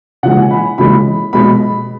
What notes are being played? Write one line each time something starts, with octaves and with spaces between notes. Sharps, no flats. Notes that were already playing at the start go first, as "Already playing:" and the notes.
C#3 E3 G#3 F#5
G#5
B5
C#3 E3 G#3 B5
B2 G#3 B5